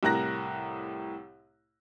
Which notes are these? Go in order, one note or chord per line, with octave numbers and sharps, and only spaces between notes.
C2 A2 A#4 F#6 A#6